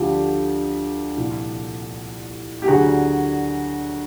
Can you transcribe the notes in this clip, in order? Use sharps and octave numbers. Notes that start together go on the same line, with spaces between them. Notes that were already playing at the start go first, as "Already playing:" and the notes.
Already playing: D2 D3 F3 G4 A4
C2 A#2 F3
G4
D2 D3 F#3 F#4 G#4